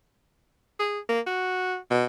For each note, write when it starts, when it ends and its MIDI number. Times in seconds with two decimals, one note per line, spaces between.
0.79 0.99 68
1.09 1.20 58
1.27 1.76 66
1.90 2.05 47